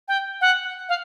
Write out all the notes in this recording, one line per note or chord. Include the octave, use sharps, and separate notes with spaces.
G5
F#5
F5